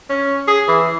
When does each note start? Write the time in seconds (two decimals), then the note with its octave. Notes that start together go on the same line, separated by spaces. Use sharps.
0.09 C#4
0.48 G#4
0.68 E3